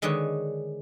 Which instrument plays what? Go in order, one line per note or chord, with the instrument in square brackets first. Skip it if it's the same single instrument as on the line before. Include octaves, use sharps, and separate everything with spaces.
[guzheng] D3 D#3 G#3 B4 C#5